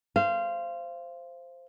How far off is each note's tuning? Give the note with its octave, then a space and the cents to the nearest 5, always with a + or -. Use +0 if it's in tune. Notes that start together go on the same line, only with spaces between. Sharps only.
C5 +0 F5 -25